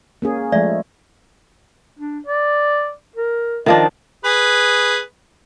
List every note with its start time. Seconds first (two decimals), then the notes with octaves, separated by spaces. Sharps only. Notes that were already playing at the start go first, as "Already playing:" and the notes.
0.22 A#3 C#4 G#4
0.52 F3 G#3 A3 D5 E5
1.97 D4
2.26 D5
3.15 A#4
3.66 D#3 F3 D4 D#5
4.24 G#4 B4